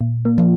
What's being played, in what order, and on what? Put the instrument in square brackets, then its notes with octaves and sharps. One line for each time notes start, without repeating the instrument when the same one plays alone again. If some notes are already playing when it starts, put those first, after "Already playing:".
[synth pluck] A#2
A#3
[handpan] F3